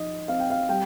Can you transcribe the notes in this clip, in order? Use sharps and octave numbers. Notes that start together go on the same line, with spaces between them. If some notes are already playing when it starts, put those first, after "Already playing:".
Already playing: F3 D#4 D#5
C4 F5
G5
F5
G3 G5